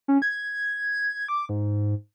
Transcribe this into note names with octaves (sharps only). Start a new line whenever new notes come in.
C#4
G#6
D6
G#2